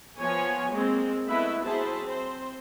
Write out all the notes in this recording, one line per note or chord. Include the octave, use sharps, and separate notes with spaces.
F3 B3 C#5 G#5
G#3 A#3 C4
A3 B3 E4 B4 D#5 E5
F#3 E4 G#4 C5 E5 A5
C4 C5